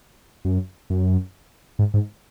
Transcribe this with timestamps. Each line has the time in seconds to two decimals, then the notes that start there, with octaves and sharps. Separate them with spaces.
0.45 F#2
0.90 F#2
1.79 G#2
1.94 G#2